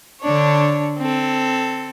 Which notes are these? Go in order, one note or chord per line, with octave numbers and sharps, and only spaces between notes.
D3 D4 C#5
C4 A4